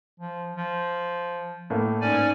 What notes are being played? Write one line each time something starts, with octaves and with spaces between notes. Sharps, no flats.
F3
F3
A2 A3 A#3
G#2 C#4 D5 G#5